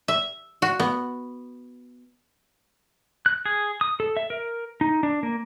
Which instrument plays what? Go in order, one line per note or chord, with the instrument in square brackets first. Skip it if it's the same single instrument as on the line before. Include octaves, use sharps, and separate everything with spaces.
[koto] E5
F#4
B3
[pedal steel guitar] F#6
G#4
D#6
A4
E5
A#4
D#4
D4
A#3